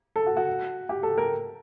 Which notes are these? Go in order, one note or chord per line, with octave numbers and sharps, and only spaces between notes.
A4
F#4
F#4
G4
A4
A#4